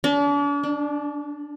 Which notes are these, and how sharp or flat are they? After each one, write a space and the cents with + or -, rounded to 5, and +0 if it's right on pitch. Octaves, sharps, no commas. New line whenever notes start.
D4 -40
D4 +10